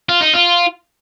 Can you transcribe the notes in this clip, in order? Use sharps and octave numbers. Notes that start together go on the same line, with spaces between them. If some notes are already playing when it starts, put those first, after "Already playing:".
F4
D#4
F4